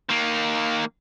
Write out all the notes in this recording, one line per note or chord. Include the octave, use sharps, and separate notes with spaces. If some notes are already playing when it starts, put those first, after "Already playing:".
D#3 A#3